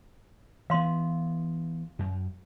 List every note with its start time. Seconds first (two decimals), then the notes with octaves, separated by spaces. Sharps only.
0.70 E3 B3 F5 C6
1.99 F#2